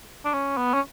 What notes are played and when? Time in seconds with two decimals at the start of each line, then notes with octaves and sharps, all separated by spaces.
0.25 D4
0.33 C#4
0.57 B3
0.74 C#4